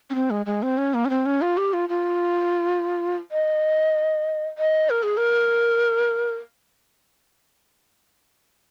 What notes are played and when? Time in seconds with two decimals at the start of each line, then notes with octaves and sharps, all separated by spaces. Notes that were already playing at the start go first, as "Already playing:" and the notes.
0.10 C#4
0.15 C4
0.30 G#3
0.46 G#3
0.63 C4
0.78 C#4
0.94 A#3
1.05 C#4
1.10 C4
1.26 C#4
1.42 F4
1.57 G4
1.73 F4
1.89 F4
3.32 D#5
4.58 D#5
4.90 A#4
5.03 G#4
5.17 A#4